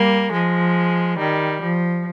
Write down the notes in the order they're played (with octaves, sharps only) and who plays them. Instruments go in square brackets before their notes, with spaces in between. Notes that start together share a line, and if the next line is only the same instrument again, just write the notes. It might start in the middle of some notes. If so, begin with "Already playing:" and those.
Already playing: [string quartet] G3 A#3
F3 G#3
D#3 G3
F3